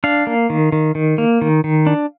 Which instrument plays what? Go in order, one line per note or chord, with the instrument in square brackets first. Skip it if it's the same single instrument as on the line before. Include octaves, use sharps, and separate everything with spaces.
[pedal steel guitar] D4 F5
A#3
D#3
D#3
D#3
A#3
D#3
D#3
D4